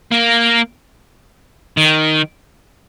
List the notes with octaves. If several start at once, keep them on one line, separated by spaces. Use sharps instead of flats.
A#3
D#3